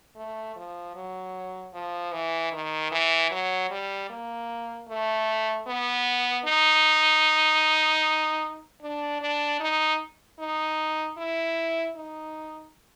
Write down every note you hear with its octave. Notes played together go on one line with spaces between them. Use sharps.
A3
F3
F#3
F3
E3
D#3
E3
F#3
G3
A#3
A3
B3
D#4
D4
D4
D#4
D#4
E4
D#4